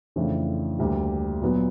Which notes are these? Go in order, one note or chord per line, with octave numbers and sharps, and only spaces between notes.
F2 C#3 E3 A3 D4
D2 D3 G3 A#3
A#2 F#3 B3